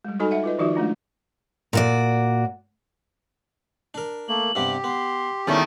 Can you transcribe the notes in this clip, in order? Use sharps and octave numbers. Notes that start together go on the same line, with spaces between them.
G3 G#3
D#4 F#4 A4 D#5 G#5 B5
E5 F#5
F4 B4 D#5
D#3 F3 D#4 F4 F#4 E5
G#3 A3 D4 F4
A#2 F#4 D5
D4 A#4
A3 A#3 F#7
G2 C3 B3 G4
B3 C6
E2 D#3 G3 A3 C#4